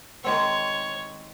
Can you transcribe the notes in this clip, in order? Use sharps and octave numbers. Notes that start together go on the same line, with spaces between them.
D#3 G#3 C4 C#5